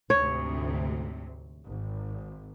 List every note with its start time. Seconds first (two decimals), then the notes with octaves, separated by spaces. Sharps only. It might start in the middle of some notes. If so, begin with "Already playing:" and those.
0.10 D2 G#2 C3 C#5
1.65 G#1